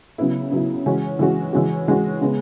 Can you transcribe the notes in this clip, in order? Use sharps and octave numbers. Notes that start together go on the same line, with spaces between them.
C#3 F#3 B3 E4
C#3 F#3 B3 E4
E3 G#3 C#4 F#4
E3 G#3 C#4 F#4
E3 G#3 C#4 F#4
E3 G#3 C#4 F#4
C#3 G#3 B3